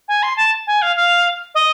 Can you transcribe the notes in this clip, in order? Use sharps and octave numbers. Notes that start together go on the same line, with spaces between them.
G#5
C6
A5
G#5
F5
F5
D#5